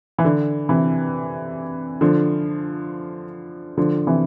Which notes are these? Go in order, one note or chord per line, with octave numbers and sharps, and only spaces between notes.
E3
D3
C3 E3
D3 F3
D3 F3
C3 E3